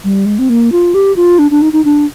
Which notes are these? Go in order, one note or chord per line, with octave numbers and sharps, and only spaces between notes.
G3
G#3
C4
A#3
F4
G4
F4
D4
D4
D#4
D#4
D4